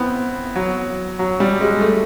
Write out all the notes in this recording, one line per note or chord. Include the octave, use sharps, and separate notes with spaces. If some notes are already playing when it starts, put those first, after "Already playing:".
Already playing: B3 C4 E4
F#3
F#3
G3
G#3
A3